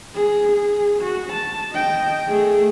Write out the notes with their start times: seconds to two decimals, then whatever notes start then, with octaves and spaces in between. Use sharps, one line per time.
0.15 G#4
0.52 G#4
1.02 F#4
1.33 A5
1.72 D#5 G5
2.28 A3 G#4